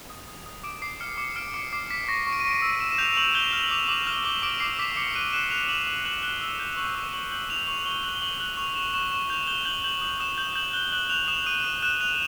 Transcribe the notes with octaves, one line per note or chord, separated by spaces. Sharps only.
D#6
D#6
D#6
D6 D7
D6 C7
F6 C#7
D6 C#7
F6 D7
D6 C#7
D6 C7
D6 B6
C#6 A#6
C#6
D7
D#7
C#6 D7
D#7
E6
E6 E7
E7
G6 F7
F7
C#6 F#7
G6 G7
E7
F6 F7
F#7
D6 F7
D6 F#7
F6 G7
D6 G7
D6 D7
D6 C7
D6 B6
D6 C#7
F#6 D#7
F#6 E7
F#6 F7
D6 F#7
D6 F#7
F#6 F#7
F#6 G7
E6 F#7
G6
C#6 F#7
E6
C#6 F#7
G6 F#7
E6 F7
C#6 F#7
F#7
C#6 G7
F#6 F#7
G7
C#6 F#7
F#6 F#7
C#6 F7
C#6 E7
C#6 E7
C#6 E7
G6 F7
G6 G7
G6 F#7
G6 F#7
D#6 F#7
D#6 E7
G6 F#7
G6 F#7
F#6 G7
F#6 F#7
F#6 F7
D#6 E7
D#6 D#7
D#6 E7
F#6 E7
F#6 F7